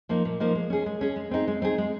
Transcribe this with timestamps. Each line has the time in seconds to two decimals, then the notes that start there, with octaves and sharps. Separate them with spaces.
0.09 F3 A#3 D#4
0.25 A#2
0.40 F3 A#3 D#4
0.55 G#3
0.70 C#4 G#4
0.86 G#3
1.01 C#4 G#4
1.16 G#3
1.31 C4 D#4 G#4
1.48 G#3
1.62 C4 D#4 G#4
1.78 G#3